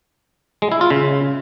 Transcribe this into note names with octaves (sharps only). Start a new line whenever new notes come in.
G#3
E4
F4
C#3